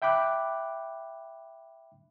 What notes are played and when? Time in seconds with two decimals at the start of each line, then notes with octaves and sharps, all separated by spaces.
0.02 E5 G5 B5 D6 F#6